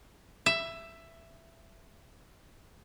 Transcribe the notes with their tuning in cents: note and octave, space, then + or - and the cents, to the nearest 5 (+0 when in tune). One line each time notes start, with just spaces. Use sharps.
E5 +10